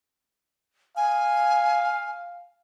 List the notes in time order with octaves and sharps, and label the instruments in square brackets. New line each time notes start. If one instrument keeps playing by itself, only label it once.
[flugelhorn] F5 [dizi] G#5